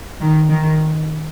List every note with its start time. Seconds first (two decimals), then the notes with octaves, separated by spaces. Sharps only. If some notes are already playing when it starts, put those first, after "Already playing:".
0.21 D#3
0.50 D#3